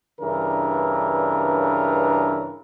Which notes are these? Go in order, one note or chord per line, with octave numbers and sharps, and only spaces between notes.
G2 C#3 E3 D4 A#4